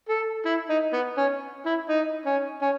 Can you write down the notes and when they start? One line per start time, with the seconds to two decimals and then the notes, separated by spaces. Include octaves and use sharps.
0.09 A4
0.46 E4
0.70 D#4
0.93 B3
1.17 C#4
1.66 E4
1.89 D#4
2.26 C#4
2.62 C#4